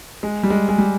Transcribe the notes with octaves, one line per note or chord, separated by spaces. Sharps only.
G#3
G3
G#3
G#3
G3